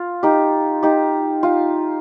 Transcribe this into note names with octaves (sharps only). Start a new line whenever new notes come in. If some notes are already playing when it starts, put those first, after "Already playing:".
Already playing: F4
D#4 G4
D#4 G4
F4